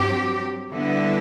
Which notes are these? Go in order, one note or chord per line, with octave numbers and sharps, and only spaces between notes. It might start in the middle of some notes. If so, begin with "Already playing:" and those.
Already playing: G2 F#3 C4 G4
D3 G3 B3 E4